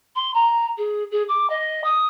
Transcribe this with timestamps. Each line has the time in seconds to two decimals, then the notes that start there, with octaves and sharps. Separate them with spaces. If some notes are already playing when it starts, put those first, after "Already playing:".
0.16 C6
0.34 A#5
0.78 G#4
1.11 G#4
1.29 D6
1.50 D#5
1.84 D#6